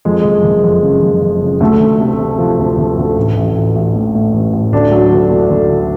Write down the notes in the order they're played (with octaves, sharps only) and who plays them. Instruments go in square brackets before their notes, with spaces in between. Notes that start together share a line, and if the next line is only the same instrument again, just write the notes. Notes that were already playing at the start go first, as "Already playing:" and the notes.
[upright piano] F2 G#3
F#1 G#3
F#1
F2
C#3
F#1
F#1
C#3
D2 A3
D2
C3
C3
F3
D2
D2
D2
A1
A1
A1
A1
A2
A2
A1
A1
D2 D4
F#3
D2
D2
D2
D3